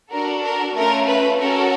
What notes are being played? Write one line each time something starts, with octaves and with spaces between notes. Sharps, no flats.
D4 F#4 A4 A#4
A#4
A3 C#4 F4 A#4
B4
C#4 F#4 A4 A#4